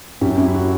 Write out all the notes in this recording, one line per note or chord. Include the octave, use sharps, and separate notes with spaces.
F#2 G4
F#2 E4
F#4